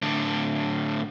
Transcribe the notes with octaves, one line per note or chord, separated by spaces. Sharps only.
A2 D3